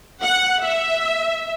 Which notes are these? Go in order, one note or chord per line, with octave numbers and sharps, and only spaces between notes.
F#5
E5